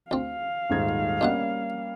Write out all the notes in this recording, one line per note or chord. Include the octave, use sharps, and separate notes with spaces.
D2 C4 F5
D#1 G#2 G#6
G2 B2 G3 A#3 C#4 F#5